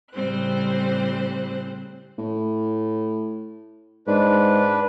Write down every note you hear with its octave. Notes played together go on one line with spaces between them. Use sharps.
A2 C#3 G3 C4 C5 F#6
A2
G#2 D4 B4